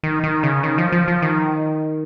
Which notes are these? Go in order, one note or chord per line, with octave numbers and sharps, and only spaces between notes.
D#3
D#3
C#3
D#3
F3
F3
F3
D#3